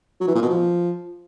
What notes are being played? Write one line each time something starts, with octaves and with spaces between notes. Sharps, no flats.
F#3
E3
A#2
B2
F3